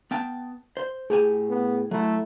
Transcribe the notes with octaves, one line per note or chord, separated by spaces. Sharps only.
B3 G5 A5
C5
A2 G4 G#4 G#5
B3
F#3 A3 E4